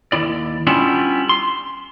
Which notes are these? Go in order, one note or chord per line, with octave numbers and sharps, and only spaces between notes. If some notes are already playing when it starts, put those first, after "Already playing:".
D#2 E4 D5
G3 B3 C#4 D4 E4 F4
C6